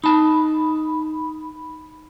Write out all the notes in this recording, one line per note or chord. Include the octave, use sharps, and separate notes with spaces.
D#4 A5 B5